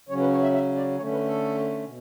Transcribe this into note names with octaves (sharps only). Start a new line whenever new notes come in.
C#3 F#3 C#4 C#5
B4
C#5
E5
E5
D5
D3 A3 C#4 C#5
B4
A4
B2